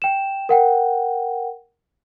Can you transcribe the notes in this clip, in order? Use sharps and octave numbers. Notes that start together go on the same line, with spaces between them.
G5 E7
A#4 F#5 G5